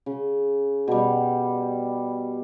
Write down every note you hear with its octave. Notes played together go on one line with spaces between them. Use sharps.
C#3
B2 G3